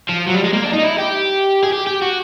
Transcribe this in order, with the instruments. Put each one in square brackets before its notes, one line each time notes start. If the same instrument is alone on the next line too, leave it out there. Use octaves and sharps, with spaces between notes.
[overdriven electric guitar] F3
F#3
G3
G#3
A#3
D4
D#4
E4
G4
G#4
G4
G4
F#4